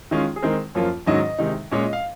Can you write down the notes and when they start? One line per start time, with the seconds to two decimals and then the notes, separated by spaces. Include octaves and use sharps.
0.11 D#3 G#3 C#4 F4
0.36 G#4
0.42 D#3 G#3 C4 A#4
0.75 F#2 F3 A#3 F4 C#5
1.06 G#2 D#3 F#3 C#4 D#5
1.38 C3 D#3 G#3 D#4
1.71 A#2 G#3 C#4 C#5
1.83 D#5
1.93 F5